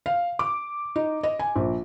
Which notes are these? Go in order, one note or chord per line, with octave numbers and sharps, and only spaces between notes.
F5
D6
D#4
D#5
G#5
A#1